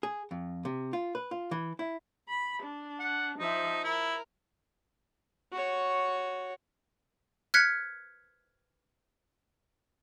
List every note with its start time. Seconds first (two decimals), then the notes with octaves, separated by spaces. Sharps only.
0.03 G#4
0.31 F2
0.65 C3
0.93 F4
1.15 B4
1.31 F4
1.51 E3
1.79 E4
2.29 B5
2.63 D4
3.00 F#5
3.39 F3 D#4 E5
3.84 E4 A#4
5.52 F#4 C#5
7.54 F6 F#6 G#6 B6 C#7